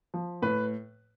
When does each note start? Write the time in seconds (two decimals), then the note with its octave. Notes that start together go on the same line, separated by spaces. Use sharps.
0.14 F3
0.42 A2 B4